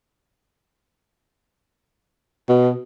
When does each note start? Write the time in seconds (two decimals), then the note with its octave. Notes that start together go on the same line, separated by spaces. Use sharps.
2.49 B2